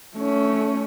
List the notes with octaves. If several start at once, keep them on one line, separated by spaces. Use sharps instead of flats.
A3 C#4